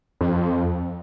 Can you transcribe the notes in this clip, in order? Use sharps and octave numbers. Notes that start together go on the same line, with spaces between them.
F2